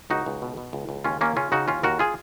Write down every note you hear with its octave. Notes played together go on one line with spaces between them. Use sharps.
C#2 D#4 F#4
C#2
B2
B2
C#2
C#2
D#2 C#4 F4
D#2 A#3 C#4
C#3 C#4 F4
C#3 D#4 F#4
D#2 C#4 F4
D#2 F#4 A#4
F4 G#4